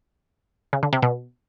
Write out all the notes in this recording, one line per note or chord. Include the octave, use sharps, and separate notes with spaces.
C#3
D3
C3
B2